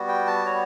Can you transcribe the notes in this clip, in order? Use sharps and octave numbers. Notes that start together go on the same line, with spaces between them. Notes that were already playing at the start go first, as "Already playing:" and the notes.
Already playing: G3 B3 F#4
G5
A5
C#5